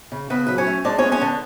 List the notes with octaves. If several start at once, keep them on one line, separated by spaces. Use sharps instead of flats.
C#3
C#3 B3 B4
F#3 B4
C#4 C#5
A3
G#3 D4 D5
C#4 C#5
B3
C#4 C#5
D3